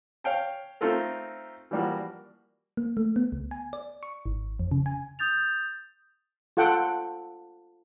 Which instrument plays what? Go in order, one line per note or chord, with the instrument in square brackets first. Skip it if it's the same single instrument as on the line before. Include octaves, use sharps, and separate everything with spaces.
[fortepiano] C#5 F5 G5 A5
A3 C4 D#4 F4 A4 A#4
E3 F3 G3 A#3 F#4
[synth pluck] A#3
A3
B3
C#2
G#5
D5
C#6
G#1
F2
C#3
G#5
[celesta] D#6 G6 A6 F7
[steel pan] F4 A4 F#5 G5